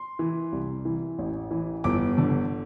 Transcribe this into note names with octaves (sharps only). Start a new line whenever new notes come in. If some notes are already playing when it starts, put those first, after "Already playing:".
Already playing: C6
E3
C2
E3
A1
E3
G1 D6
D3